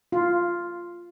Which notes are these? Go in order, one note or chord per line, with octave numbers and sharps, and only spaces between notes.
F4